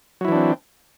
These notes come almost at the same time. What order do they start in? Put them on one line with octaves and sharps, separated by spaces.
F#3 E4 E3 D4 C4